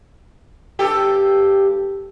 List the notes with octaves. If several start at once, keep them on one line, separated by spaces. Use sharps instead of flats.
G2 G4 A4